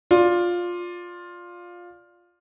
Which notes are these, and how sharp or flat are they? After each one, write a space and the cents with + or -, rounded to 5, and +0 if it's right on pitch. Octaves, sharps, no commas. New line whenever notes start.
F4 +10 D5 +0